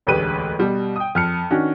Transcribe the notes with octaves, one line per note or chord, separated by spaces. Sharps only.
E1 A1 D2 G4 B4 D#7
B2 G3
G5 D#6
F2 F6 C#7
D#3 C#4 D4 F#4